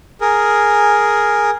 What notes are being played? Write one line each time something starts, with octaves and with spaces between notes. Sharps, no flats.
G#4 A#4